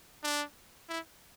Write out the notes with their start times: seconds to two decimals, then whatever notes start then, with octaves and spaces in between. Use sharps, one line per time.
0.24 D4
0.89 E4